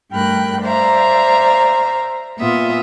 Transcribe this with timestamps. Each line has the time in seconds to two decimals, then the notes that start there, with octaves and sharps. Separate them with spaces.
0.12 G2 A3 A#4 G5 B5 F#6
0.64 C5 D5 E5 F5 A#5
2.39 A#2 B3 F4 E5 D#6